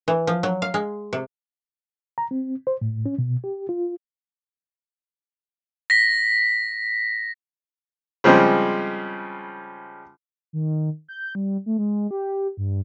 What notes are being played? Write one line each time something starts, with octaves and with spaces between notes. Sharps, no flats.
E3
F3
F#3
F5
G#3
C3
A#5
C4
C5
A2
C#4
B2
G4
F4
A#6 B6
C#3 F3 G3 G#3 C4
D#3
G6
G3
A3
G#3
G4
G2